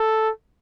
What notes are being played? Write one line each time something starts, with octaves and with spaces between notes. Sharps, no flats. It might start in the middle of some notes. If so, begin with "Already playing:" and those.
Already playing: A4